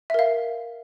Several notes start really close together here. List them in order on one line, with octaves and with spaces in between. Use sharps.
E5 A#4 F5